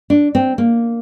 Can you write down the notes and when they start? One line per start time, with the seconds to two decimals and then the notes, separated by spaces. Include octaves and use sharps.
0.10 D4
0.35 C4
0.58 A#3